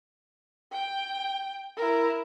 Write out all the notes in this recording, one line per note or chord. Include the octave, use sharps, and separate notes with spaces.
G5
E4 A#4